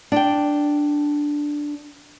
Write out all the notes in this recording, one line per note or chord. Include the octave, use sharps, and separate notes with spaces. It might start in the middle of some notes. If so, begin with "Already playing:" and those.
D4 G5